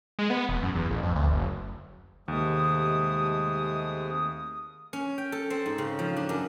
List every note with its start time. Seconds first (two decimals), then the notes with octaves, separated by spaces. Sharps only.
0.19 G#3
0.30 B3
0.49 E1
0.62 F#2
0.75 E2
0.90 A1
1.03 F2
1.15 D2
1.31 F#1
2.28 D#2 C3 G#3 A3 D#6
4.93 C#4
5.18 G5
5.32 A4
5.50 C4
5.66 G#2
5.78 C#3
5.99 F3
6.16 D4
6.29 F#2